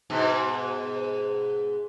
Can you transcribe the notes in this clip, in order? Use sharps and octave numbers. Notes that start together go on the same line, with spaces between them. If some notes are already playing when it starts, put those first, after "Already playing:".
G#2 B2